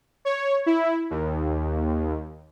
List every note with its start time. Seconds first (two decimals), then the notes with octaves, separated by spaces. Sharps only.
0.25 C#5
0.66 E4
1.10 D#2